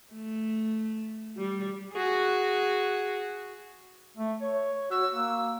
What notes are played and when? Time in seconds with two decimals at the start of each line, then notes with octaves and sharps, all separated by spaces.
0.14 A3
1.37 G3
1.93 F#4 G#4
4.17 A3
4.42 C#5
4.91 F#4 E6
5.11 A#3